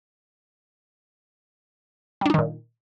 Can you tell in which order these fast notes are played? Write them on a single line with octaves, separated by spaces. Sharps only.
G3 D4 D#4 D#3 A#2